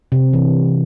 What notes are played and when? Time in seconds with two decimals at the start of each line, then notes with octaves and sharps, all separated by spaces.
0.12 C3
0.33 E3